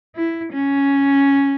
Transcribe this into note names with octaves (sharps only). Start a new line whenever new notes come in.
E4
C#4